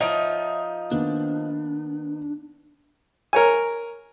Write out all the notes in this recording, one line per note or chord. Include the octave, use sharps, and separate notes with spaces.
F3 D#4 C#5 E5
D#3 A#3 B3 D4
A#4 C#5 G#5